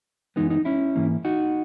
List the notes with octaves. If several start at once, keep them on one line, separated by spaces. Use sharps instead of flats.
F#2 E3 G#3 B3 D#4
D#4
C#4 E4
G#2 E3 A#3
D#4 F#4